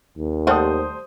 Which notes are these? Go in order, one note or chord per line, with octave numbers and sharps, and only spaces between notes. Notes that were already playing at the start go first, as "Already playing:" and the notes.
D#2
G3 A3 F#4 C5 D#6